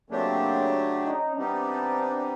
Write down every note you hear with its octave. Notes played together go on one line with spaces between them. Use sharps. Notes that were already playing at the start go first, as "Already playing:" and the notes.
C#3 F#3 A3 A#3 C4 D4 G4
C#4 D#4
E3 G3 B3 C4 D4 D#4 G4